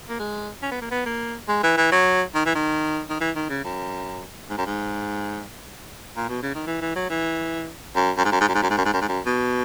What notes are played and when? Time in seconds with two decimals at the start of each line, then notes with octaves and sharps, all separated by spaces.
0.09 A#3
0.20 G#3
0.63 C#4
0.72 B3
0.82 A#3
0.91 B3
1.06 A#3
1.48 G#3
1.63 E3
1.77 E3
1.92 F#3
2.34 D#3
2.46 E3
2.55 D#3
3.10 D#3
3.21 E3
3.36 D#3
3.50 C#3
3.65 F#2
4.50 G#2
4.58 F#2
4.67 G#2
6.17 A#2
6.29 B2
6.43 C#3
6.55 D#3
6.67 E3
6.82 E3
6.96 F#3
7.10 E3
7.96 F#2
8.17 F#2
8.25 G#2
8.32 F#2
8.41 G#2
8.48 F#2
8.55 G#2
8.63 F#2
8.70 G#2
8.78 F#2
8.85 G#2
8.93 F#2
9.02 G#2
9.09 F#2
9.26 B2